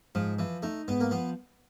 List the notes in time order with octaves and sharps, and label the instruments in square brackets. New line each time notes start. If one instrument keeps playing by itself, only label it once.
[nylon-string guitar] G#2 [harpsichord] F3
[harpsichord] E3 [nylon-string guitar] F3
[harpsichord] A3 [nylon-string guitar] D#4
[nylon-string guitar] G#2 [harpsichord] B3
[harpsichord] A#3
[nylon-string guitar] F3 [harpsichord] B3